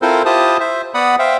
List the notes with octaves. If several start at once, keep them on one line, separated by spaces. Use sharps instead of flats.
C4 E4 F4 A4 A#4 C5
E4 F4 G4 C5 A5 D#6
C5 E5
B3 D5 F#5 B5 D#6
C5 E5 F5 G5